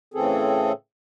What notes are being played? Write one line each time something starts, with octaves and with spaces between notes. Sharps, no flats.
A2 C#3 E3 C4 G#4 A4